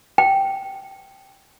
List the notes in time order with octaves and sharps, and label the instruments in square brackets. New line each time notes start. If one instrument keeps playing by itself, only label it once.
[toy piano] G5